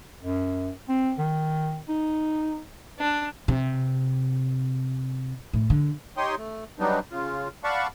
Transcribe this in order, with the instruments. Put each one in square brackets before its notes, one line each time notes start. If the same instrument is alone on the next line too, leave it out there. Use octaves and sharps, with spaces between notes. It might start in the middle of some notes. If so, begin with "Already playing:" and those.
[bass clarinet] F#2
C4
D#3
D#4
[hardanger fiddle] D4
[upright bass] C3
A2
D3
[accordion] D#4 G4 C#5 G5 C6 D#6
A3
F#3 G3 B3 D4 D#4
C#3 F4
D5 F5 F#5 A5 B5 C#6